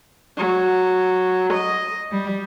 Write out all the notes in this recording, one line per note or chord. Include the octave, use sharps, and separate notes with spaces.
F#3
D#5
G3